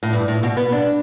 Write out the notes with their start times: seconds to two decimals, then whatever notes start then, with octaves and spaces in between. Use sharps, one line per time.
0.03 A2
0.13 G2
0.28 A2
0.43 B2
0.57 B3
0.72 D4